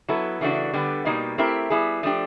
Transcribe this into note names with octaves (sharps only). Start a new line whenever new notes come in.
F#3 B3 E4 A4
C#3 E3 A3 D4 F#4
D3 G3 B3
B2 G3 A#3 D#4
A3 C4 E4 G4 A#4
G3 B3 E4 G#4
F3 A3 D4 G4